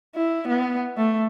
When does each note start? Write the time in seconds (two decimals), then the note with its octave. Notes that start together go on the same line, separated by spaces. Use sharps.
0.16 E4
0.48 B3
0.97 A3